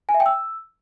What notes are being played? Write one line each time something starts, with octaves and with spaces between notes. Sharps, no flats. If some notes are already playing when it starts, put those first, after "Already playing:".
G#5
E5
G5
E6